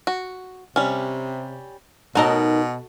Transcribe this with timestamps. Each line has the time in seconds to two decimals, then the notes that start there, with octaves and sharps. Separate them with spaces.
0.07 F#4
0.76 C3 G3 C#4
2.15 B2 D#4 F#4 A4 A#4 D#5